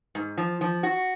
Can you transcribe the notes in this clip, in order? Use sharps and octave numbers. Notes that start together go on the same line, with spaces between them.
G#2
F3
F3
F#4